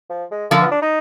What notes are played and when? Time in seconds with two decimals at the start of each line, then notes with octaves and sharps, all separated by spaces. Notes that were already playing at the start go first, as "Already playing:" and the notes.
0.10 F3
0.31 G#3
0.50 D3 F3 A#3
0.61 B3
0.72 D4
0.82 D#4